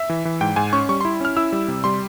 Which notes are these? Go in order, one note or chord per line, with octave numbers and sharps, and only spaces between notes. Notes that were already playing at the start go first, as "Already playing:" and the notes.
Already playing: E5
E3
E3
G#2 G5
G#2 G#5
C#4 C#6
G3 C#6
E4 C6
C#4 F6
E4 E6
G3
C3
G3 C6